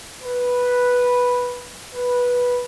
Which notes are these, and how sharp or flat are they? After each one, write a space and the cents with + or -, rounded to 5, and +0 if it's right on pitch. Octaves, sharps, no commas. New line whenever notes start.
B4 -5
B4 -10